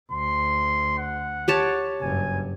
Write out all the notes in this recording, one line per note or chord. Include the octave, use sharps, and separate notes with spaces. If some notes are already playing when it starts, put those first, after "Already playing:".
D2 C6
F#5
G4 C#5 A5
F#1 G2 G#5